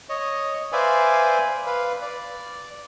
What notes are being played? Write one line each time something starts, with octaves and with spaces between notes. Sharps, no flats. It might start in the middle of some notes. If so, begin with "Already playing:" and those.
C#5 D#5
B4 C5 D5 E5 F5 G#5
B4 F5
D5